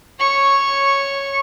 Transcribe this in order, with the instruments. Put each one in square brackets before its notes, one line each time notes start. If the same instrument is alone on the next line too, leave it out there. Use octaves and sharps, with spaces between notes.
[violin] C#5 C#6